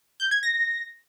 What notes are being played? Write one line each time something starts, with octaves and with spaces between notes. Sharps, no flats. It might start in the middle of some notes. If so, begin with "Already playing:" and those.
G6
G#6
A#6